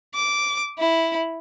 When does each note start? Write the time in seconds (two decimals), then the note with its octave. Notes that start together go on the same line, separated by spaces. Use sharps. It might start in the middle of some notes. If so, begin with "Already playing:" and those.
0.15 D6
0.79 E4